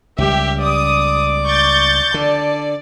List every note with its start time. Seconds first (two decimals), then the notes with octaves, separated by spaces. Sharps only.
0.18 C#2 G3 G4 E5
0.62 D5 D6 D#6
1.45 C#6 G6 A6
2.14 D3 D5 A5